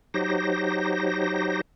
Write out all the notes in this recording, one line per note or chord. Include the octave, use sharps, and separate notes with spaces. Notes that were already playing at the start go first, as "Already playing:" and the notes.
F#3 D#4 G4 C5 A#6